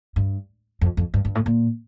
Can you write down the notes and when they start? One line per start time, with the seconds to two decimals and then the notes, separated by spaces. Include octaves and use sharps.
0.16 G2
0.81 F2
0.97 F2
1.14 G2
1.25 G2
1.35 A2
1.46 A#2